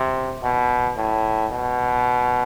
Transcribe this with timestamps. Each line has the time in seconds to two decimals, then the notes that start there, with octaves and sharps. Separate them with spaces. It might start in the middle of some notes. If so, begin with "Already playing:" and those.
Already playing: C3
0.43 B2
0.97 A2
1.52 B2